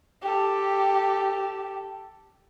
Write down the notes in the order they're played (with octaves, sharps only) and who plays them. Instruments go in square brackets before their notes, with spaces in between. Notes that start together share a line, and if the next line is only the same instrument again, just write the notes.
[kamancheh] G4 A4